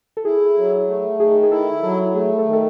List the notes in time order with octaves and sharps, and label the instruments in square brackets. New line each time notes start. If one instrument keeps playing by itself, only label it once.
[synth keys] A4
[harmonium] E4 [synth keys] G#4
[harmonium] F#3
A3
[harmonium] D#3 [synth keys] G#4
[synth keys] G#4
[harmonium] E4 [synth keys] A4
[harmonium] F#3 [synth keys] A4
[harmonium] A3 [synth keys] G#4
[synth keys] A4
[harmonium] D#3
[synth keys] A4